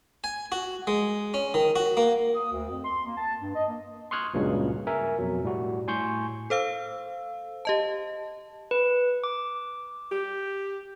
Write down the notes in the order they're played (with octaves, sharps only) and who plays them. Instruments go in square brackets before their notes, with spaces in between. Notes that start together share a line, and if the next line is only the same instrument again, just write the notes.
[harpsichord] G#5
F#4
G#3
C#4
D#3
F#4
A#3
[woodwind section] D#6
D2
F2
C6
A#3
A5
G2
D#5
A#3
[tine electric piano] C6 C#6 D#6 F6 F#6 G#6
C#2 G2 A#2 C#3 F#3 G#3
A#4 E5 G#5
F2 B2 F#3
A2 G3 F#4
A2 G#5 C6 C#6 G6
[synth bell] A4 C5 F5 E6
G4 D#5 A5
[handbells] B4
D6
[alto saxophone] G4